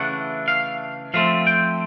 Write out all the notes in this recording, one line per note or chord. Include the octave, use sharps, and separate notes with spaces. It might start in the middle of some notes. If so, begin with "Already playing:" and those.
Already playing: C#3 E3 A3 D4 F#5
F5
F3 A3 C4 F5
G5